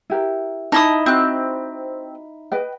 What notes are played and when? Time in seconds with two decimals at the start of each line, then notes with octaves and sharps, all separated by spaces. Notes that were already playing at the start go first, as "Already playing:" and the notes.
0.10 E4 G4 A#4
0.72 D#4 E4 A5 D#6
1.06 C4 F#4 F#6
2.52 B4 D#5 G5